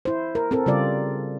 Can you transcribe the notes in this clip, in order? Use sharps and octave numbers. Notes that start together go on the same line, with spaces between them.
E4 C5
A#4
C4 A4 A#4
C#3 G3 F4 D5